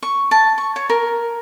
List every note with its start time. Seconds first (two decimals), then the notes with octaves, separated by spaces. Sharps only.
0.02 C#6
0.31 A5
0.58 C#6
0.76 C#5
0.90 A#4